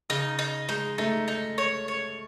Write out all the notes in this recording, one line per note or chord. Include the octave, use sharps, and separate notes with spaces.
C#3 D#4
D#4
G#3 D#4
A3 D#4
D#4
C#5
C#5